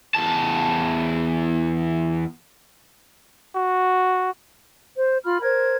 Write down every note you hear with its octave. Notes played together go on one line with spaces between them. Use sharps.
E2 A5
F#4
C5
F4 B5 F6
A#4 C5 G#6